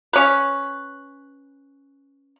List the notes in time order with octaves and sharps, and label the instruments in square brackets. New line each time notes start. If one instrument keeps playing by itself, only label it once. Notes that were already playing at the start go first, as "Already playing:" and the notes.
[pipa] C#4 B4